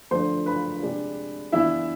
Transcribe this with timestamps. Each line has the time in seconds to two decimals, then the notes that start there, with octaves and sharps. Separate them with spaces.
0.11 D3 F3 A3 D4 C5 C6
0.46 B4 B5
0.82 C3 G#3 D4
1.52 E3 B3 D4 E4 E5